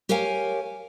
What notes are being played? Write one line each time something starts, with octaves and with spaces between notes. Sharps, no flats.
G4 A#4 C#5 F5 G#5